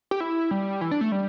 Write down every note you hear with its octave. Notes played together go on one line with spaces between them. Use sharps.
G4
E4
G3
E3
D4
A3
G3